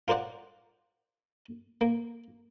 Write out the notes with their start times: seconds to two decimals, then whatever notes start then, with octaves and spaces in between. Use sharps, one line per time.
0.08 F4 A#4 C5 D5 F#5
1.81 A#3